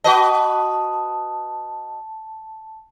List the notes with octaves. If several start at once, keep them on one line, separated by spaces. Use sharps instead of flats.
F#4 B4 D#5 A5